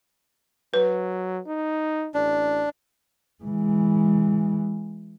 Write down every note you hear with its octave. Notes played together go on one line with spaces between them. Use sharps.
F#3 B4
D#4
A1 D4
E3 G#3